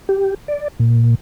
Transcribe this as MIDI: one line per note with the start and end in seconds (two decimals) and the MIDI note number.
0.09 0.34 67
0.48 0.68 74
0.79 1.15 46